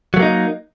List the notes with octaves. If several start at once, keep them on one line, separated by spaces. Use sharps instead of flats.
F#3 A3 A#3 D#4